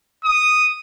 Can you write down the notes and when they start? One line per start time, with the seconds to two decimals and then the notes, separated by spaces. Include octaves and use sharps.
0.25 D#6